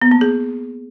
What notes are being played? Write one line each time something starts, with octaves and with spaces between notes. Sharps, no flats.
B3
A#3
G#4